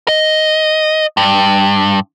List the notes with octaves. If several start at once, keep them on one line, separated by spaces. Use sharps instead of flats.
D#5
G2